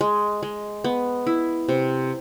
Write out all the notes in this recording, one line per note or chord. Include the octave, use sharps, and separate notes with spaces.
G#3
G#3
B3
E4
C3